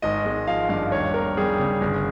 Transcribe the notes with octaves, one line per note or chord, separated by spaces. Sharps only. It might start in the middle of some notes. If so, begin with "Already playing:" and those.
G#1 D#5
G#3
F3 F5
G2 F5
D#2 C#5
A#3 A#4
G3 G#4
C#3
G1